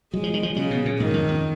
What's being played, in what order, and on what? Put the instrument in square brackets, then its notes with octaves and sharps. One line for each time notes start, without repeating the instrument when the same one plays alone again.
[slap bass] F#3 [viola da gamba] G#3
[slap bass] F3
D#3
F3
[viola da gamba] C#3 [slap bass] F#3
[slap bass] B2
A#2
[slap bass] G#2 [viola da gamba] D#3
[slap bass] F2
F2